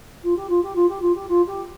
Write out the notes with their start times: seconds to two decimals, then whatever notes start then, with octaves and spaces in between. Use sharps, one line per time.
0.24 F4
0.36 G4
0.49 F4
0.63 G4
0.75 F4
0.89 G4
1.02 F4
1.15 G4
1.29 F4
1.47 G4